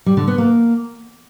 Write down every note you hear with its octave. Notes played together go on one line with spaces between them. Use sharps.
G3
D3
B3
A#3